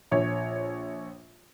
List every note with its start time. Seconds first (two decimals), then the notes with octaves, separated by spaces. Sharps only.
0.11 A#1 C#5